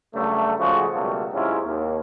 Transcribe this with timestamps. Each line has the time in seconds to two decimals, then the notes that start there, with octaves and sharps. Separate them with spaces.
0.15 G2 C#3 F#3 A3
0.59 C#3 F3 G#3 A3 F#4
0.94 C#2 B2 F#3 G3 A3 A#3
1.34 G#2 C3 F#3 C#4 E4 F4
1.64 D#2